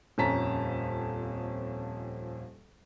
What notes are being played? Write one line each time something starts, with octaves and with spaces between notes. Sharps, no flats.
D#1 F2 C#4 A5 A#5 B6